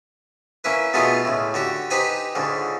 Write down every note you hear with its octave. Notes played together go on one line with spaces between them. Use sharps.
A#3 C#4 E4 B4
B2 A3 B3 D#4 F4 G#4
C#2 A2
D3 F#4 G4
D#4 G4 B4 C5 G#5 B5
C#2 G#2 D3